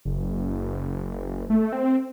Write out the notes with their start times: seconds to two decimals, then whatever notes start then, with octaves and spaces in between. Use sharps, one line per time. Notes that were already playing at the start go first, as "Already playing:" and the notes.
0.05 F#1
1.50 A3
1.73 C4